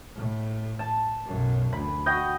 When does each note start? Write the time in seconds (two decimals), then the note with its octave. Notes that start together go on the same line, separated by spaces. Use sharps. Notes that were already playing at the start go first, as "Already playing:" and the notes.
0.15 A2
0.79 A5
1.25 B1 F#2
1.73 D2 B5
2.06 F#4 D#5 G5